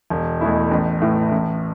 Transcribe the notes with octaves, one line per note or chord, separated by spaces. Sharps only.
E1
E2 B2 A3 E4
A1
A2 E3
A1